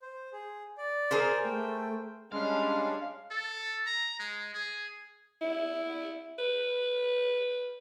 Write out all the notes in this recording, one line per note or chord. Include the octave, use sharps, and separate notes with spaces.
C5
G#4
D5
G#4 A#4 C5
A3 G5
G3 G#3 C#4 D4 F5
A4
A#5
G#3
G#4
E4
B4